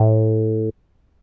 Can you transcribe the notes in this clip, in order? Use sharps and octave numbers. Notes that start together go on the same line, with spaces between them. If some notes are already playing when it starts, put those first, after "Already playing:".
Already playing: A2